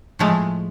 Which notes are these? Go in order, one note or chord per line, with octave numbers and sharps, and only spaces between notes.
A2 F3 G#3 A3